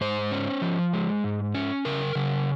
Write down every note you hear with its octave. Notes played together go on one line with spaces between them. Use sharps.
G#2 C5
C#4
F3
G#3
G#2
C#4
C#3 A#4
C#3